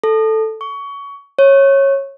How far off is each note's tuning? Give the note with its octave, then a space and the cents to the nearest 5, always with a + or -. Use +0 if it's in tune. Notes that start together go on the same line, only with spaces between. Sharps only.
A4 +0
C#6 +20
C#5 -15